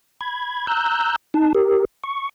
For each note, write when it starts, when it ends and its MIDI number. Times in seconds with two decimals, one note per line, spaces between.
0.21 0.66 83
0.21 0.66 92
0.67 1.16 82
0.67 1.16 88
0.67 1.16 90
0.67 1.16 91
1.34 1.53 63
1.34 1.53 81
1.55 1.85 67
1.55 1.85 70
2.04 2.29 85